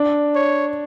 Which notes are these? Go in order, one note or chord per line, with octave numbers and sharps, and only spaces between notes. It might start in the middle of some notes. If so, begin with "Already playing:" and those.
Already playing: D4
C#5